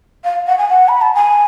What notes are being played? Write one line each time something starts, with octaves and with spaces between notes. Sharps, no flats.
F5
F#5
G#5
F#5
B5
A5
G#5